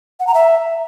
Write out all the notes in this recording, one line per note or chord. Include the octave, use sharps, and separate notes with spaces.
F#5
A#5
E5